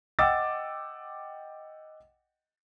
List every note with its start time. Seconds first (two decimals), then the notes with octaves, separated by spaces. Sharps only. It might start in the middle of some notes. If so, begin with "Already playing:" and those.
0.19 D#5 F#5 G5 D6 E6 A6